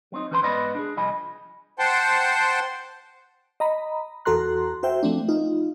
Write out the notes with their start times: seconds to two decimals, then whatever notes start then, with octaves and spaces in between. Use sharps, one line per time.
0.12 F#3 C4 D#4
0.31 E3 C#4 B4 C5 A5 C6
0.43 G#2 B3 B4 D5 D#5 B5
0.75 D4 F#4 G#4
0.97 C2 F3 D#5 G#5 B5
1.79 C5 F#5 G5 A5 C6
3.60 D#5 A#5 B5
4.25 E2 F#4 A4 A#5 C6 F#6
4.83 F#4 C5 E5 G5
5.03 F3 A3 C4 D4
5.28 D#4 F4